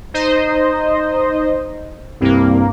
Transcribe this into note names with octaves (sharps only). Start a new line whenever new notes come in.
D#4 C5 D#5
C2 G2 A#3